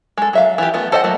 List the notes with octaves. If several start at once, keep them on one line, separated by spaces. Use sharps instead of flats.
G#3 A4
F#3 E5 F5
E3 F4 G4
A3 B3 F4
A4 C5 D#5 F5 F#5
F#3 A3 A#3